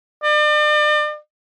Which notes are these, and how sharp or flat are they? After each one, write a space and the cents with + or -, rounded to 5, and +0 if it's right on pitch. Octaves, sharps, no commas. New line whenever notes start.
D5 +40